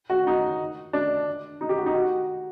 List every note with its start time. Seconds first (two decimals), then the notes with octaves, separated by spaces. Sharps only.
0.10 F#4
0.27 D#4
0.93 D4
1.61 D#4
1.69 G4
1.78 F#4
1.86 D#4
1.94 F#4